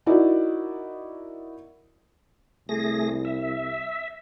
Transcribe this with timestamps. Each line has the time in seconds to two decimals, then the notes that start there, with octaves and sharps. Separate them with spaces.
0.06 D#4 E4 F#4 A#4 D5 D#5
2.69 C2 A3 G#4 A#6
3.25 E5